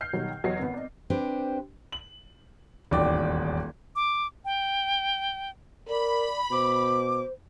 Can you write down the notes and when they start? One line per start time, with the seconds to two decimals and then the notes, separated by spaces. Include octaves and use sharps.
0.01 F6 G6 C7
0.13 B2 D#3 F#3 G3
0.30 G5
0.44 E2 F#3 C#5 D#5 C7
0.59 G#1 B3
0.74 D5 D#5
1.10 C4 D4 G4 B4 C5
1.92 F#7
2.91 D#1 G#1 E2 F#4 D5 G5
3.96 D6
4.45 G5
5.89 A#4 D5 B5
6.51 B2 C5 D6